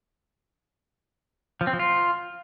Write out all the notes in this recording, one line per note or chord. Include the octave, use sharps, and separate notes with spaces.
F3
C4
F3
F4